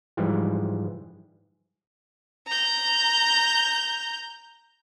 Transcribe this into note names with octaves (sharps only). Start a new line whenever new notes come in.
G#2 E3 F3 G3
A#5 G6